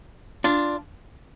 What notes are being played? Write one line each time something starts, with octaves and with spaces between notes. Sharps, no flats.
D4 F4